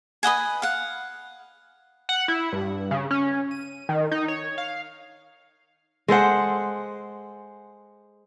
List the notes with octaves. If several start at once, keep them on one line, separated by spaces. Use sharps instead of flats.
B4 D#5 F#5 G#5
F5 F#5
F#5
E4
G2
C#3
C#4
D#7
D#3
D#4
C#5
F5
G#3 A4 C5 F#5